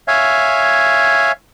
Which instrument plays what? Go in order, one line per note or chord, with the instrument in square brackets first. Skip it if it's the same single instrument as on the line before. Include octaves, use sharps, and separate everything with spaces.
[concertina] C#5 E5 F5 G#5